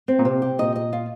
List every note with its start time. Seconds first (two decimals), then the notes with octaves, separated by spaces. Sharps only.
0.08 C4
0.19 A#2
0.25 C3 C4
0.42 G4
0.59 A#2 D#5
0.76 D#5
0.93 F4